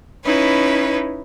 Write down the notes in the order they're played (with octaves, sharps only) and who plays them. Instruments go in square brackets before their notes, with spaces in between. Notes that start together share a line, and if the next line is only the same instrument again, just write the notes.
[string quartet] C#4 D#4 E4 B4 C#5